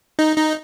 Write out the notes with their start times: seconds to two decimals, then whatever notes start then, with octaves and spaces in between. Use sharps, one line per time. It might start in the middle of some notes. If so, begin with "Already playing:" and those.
0.19 D#4
0.37 D#4